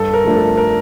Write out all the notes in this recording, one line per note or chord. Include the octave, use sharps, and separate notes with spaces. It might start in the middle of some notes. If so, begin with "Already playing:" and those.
Already playing: G2 A4
A#4
F3 A3 D4
A4
A#4